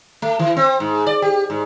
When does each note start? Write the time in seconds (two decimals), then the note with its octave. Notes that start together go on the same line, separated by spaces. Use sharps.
0.22 A3
0.39 E3
0.57 C4
0.80 G#2
1.06 D5
1.22 G4
1.50 G#2